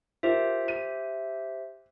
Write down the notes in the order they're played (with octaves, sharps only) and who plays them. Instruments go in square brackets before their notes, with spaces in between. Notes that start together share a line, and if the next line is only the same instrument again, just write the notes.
[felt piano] F4 A#4 [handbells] G4 C5 E5
[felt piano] D#7